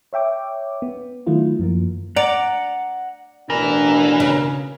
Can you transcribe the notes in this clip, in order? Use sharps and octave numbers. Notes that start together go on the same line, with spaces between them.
C#5 E5 G5 D6
B3
D#3 F#3 A3 E4 F4
F#2 F3 A#3
D5 F#5 A#5
A1 B2 E3 D4 A#4
C#3